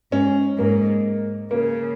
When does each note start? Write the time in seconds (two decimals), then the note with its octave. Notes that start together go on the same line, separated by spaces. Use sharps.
0.12 G#2 C#4
0.58 G#2 A#3
1.51 C#3 A#3